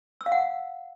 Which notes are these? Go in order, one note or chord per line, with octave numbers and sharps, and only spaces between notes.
E6
F5
F#5